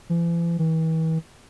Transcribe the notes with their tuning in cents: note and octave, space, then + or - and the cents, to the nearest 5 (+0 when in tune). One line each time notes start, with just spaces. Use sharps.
E3 +45
E3 -40